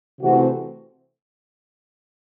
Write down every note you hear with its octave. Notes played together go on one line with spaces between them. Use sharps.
C3 E3 A3 C4 F#4